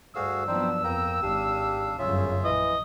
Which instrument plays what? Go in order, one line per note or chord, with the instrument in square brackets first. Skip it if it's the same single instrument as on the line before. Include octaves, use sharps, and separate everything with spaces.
[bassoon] D2 [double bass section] G2 [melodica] F#4 G#4 F5 [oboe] E6
[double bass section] F3 F#3 B3 [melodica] C4 D#4 C5 [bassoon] D4
[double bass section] F2 [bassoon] A#3 [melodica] G5 A#5
[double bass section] G#1 [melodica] D4 F5 [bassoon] G4
[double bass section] G1 F#2 [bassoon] C#3 [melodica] F4 G#4 E5
[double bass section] A#1 [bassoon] E3 [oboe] D#5